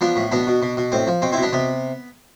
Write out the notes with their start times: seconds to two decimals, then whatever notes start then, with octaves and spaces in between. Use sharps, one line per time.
0.01 F3 B3 D4
0.16 A2
0.31 B2 B3 D4
0.47 B2
0.62 B2
0.77 B2
0.92 A2 C4
1.07 F3
1.22 B2 C4
1.32 C4 E4
1.37 B2
1.43 B3 D4
1.53 C3 B3